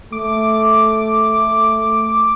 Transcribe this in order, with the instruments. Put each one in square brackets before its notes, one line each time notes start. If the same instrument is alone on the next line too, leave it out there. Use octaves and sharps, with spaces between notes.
[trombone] A3 [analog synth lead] D6